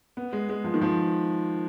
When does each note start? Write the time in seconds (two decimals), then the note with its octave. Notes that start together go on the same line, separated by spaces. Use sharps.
0.17 B3
0.33 G#3
0.49 G#3
0.64 F3
0.74 D#3
0.81 F3